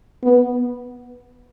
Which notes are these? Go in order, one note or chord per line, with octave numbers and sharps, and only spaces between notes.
B3